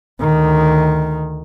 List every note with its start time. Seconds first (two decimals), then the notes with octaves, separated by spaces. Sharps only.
0.20 D2 D#3